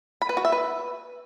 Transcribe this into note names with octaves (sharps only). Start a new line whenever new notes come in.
B5
B4
F#4
E5
B4